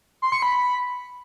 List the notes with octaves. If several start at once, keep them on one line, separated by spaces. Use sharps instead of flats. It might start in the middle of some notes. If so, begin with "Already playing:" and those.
C6
C#7
B5